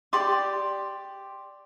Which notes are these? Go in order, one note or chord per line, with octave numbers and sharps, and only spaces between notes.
G4 D5 C6 D6